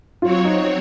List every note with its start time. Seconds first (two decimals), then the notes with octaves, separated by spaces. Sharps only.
0.22 F#3 C4 F4 F#4 C#5
0.45 D#4